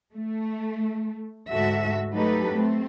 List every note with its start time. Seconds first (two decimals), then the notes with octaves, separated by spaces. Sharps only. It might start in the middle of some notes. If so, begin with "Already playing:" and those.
0.13 A3
1.50 D2 G#2 F#4 A4 E5
2.13 F#3 A3 D#4 G4 A4 B4
2.53 A3 C4